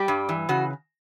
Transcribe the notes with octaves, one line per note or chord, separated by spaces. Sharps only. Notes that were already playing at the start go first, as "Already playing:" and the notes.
Already playing: G3 G4
G2
E3
C#3 F#4